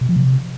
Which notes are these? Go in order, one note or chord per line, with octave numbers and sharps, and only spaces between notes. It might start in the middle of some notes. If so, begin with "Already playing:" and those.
B2
F3
C3